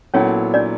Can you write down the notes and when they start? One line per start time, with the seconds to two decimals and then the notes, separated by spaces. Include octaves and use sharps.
0.14 A#2 F#3 B3 C#4 E4 A4 C#5
0.54 D4 D5